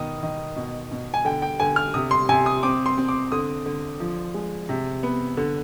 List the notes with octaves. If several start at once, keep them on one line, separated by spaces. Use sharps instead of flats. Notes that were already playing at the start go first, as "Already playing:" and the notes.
Already playing: B2 D#3 D#6
D#3
B2
B2
G#5
D3 G5
G5
D3 G#5
F6
C3 D#6
C6
C3 G#5
D#6
C4 D6
C6
C4
D6
D3 D#6
D3
F3
G#3
C3
B3
D3